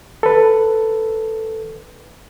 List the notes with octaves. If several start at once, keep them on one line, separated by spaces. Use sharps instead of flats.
A4 B4